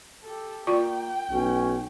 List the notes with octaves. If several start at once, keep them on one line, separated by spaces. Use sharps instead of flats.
G4 A4
A#3 F4 D5 G5 C#6
B1 C#4